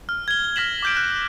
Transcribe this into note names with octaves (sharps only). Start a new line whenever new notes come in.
F6
G#6 G7
F6 G#6 A#6 B6 E7 F#7
D6 G6 D7
F#6